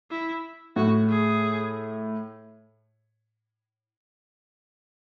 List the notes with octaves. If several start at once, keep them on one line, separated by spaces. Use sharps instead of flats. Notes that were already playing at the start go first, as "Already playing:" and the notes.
E4
A2 F#4
G#4